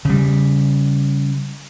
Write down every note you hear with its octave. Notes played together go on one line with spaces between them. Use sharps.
C#3 G3